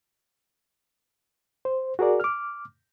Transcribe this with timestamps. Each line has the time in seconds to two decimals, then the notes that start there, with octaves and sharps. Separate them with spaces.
1.65 C5
1.99 F#4 G#4 A#4 D5
2.20 D6 F6